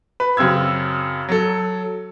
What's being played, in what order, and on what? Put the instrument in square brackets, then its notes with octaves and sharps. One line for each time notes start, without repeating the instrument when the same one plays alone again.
[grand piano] B4
F#2 C#3 C4 E6 G#6
F#3 A4